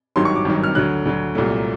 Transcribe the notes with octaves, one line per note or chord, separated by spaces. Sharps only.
G#1 G2 D#3 F#3 C6
C#6
D6
G#1 G2 D#3 F#3
F6
D2 D3 F#3 F#6
D2 D3 F#3
C2 A#2 F#3 A3